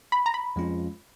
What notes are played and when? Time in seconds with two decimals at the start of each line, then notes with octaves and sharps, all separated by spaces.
0.12 B5
0.26 A#5
0.34 B5
0.56 F2 F3 G#3 C#4 F4